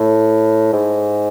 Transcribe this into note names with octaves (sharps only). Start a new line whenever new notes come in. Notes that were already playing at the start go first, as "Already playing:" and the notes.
Already playing: A2
G#2